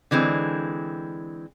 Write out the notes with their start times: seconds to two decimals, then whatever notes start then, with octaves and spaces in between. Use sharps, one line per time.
0.11 D3 E3 G#3 C4